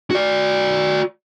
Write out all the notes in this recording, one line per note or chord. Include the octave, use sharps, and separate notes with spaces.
F#4 D5